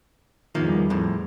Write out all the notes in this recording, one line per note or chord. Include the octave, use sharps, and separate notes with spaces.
E2 D#3 F3 G3 A#3
F2 A2